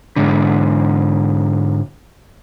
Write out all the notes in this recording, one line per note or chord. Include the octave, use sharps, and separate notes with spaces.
G#2 D3